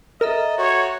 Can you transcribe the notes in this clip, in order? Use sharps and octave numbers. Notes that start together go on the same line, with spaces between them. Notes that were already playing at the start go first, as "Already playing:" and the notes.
A4 A#4 D#5 E5 A#5
F#4 C#5